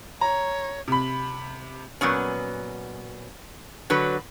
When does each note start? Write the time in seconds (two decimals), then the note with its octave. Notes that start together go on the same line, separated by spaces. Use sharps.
0.21 C#5 A#5
0.88 C3 B5
2.01 A#2 F#3 B3 C#4
3.90 D3 F#3 B4